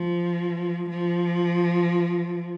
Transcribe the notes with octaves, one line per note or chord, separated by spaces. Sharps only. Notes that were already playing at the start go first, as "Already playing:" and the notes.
Already playing: F3
F3